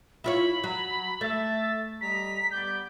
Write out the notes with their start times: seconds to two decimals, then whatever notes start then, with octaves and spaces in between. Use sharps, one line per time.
0.24 E4 F4 C#5 B5
0.64 F#3
1.21 A3 A4 E5 A6
2.01 G3 D#5 A#5 B6
2.51 G3 B3 D5 G6